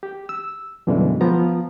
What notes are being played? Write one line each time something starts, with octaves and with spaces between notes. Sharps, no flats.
G4
E6
F#2 B2 D3 E3 G3 G#3
F3 B3 A#5